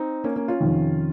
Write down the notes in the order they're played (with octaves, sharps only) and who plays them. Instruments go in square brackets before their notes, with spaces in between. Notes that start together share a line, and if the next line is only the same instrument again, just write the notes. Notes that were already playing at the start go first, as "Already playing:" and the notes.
Already playing: [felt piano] C4 D#4
A#3 C#4
A#3 C#4
C#4 F4
[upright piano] F2 C3 D#3